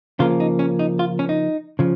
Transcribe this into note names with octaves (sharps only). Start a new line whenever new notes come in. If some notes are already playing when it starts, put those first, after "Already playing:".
C#3 F3 A#3 F4
D#4
C#4
D#4
F4
C#4
D#4
C#3 F3